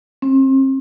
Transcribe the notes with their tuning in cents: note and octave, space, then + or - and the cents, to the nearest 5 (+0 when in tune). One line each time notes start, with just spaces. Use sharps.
C4 +35